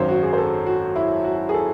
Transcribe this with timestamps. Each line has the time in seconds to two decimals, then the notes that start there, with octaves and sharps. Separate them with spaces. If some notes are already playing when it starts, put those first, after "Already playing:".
Already playing: G#1 F#2 D#3 F#3 C5 C#5
0.09 F#4
0.23 G#4
0.33 C5
0.38 A4
0.66 F#4
0.96 E4
1.24 F#4
1.49 G#4
1.54 A4